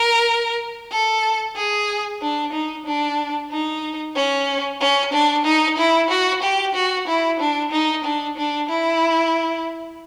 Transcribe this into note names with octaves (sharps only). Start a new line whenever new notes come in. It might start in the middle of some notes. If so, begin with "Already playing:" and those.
Already playing: A#4
A4
G#4
D4
D#4
D4
D#4
C#4
C#4
D4
D#4
E4
F#4
G4
F#4
E4
D4
D#4
D4
D4
E4